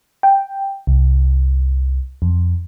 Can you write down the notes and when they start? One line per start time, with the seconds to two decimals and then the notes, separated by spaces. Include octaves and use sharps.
0.23 G5
0.87 C2
2.22 F2